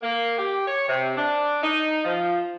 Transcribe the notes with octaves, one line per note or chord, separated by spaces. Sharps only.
A#3
G4
C#5
C3
D4
D#4
F3